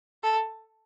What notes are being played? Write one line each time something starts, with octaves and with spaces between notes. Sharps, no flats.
A4